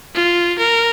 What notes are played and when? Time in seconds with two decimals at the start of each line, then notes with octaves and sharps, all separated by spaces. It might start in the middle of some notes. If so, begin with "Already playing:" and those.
0.15 F4
0.59 A#4